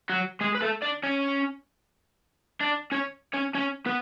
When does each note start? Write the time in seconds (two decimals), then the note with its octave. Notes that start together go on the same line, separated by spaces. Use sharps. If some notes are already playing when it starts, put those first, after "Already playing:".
0.09 F#3 F#4
0.41 G#3 G#4
0.55 B4
0.62 A3 A4
0.82 D4 D5
1.03 C#4 C#5
2.61 D4 D5
2.92 C#4 C#5
3.34 C#4 C#5
3.54 C#4 C#5
3.86 B3 B4